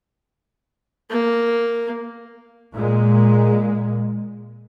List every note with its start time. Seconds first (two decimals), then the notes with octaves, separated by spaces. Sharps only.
1.10 A#3
2.73 A#2 G#3